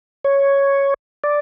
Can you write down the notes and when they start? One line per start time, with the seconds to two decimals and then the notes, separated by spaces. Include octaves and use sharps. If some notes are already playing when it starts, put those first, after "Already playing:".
0.25 C#5
1.24 D5